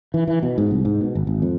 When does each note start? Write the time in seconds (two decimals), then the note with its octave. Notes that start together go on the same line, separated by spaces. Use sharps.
0.14 E3
0.27 E3
0.43 B2
0.58 G#2
0.71 C2
0.85 G#2
1.01 B2
1.15 G#1
1.27 G#1
1.42 F2